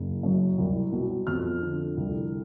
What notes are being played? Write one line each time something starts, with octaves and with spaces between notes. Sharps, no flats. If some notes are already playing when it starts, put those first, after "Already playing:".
Already playing: F#1
F#2
C2
B2
F2 F6
D3
C2